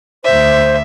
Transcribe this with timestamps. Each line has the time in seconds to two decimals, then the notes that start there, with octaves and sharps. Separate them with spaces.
0.24 D2 C5 E5